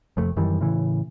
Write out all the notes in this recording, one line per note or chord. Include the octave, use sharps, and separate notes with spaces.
F1 F2 A3
F#2 D#3 E3 G3
A2 C#3 E3